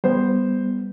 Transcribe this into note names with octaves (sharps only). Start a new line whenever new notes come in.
G3 B3 C5